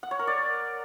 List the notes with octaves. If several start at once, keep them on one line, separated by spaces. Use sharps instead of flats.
F#5
C#5
A#4
D5